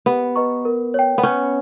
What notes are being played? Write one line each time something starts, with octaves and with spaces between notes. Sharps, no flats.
B3 G4
B4 D#5 A#5 C#6
A#4
C#5 G5
B3
C#4 C#5